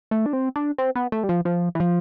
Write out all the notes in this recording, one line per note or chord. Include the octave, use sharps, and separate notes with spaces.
A3
D4
C4
D4
C4
B3
A3
G3
F3
F3
E3
F3